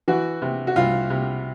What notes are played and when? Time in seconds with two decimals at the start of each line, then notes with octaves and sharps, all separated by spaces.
0.08 E3 F#4
0.42 C3
0.67 F#4
0.76 C2 F4
1.10 C3